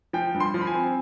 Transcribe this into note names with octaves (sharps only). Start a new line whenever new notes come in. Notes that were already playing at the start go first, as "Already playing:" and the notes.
F3 G5
G2
C6
F3
B5
G#5
C4